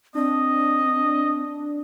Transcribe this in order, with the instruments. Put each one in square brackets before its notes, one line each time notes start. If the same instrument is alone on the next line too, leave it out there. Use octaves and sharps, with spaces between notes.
[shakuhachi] C4 [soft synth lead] D4 [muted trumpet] D#5